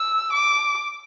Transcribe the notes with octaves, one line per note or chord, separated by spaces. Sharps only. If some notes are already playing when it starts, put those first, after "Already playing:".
Already playing: E6
D6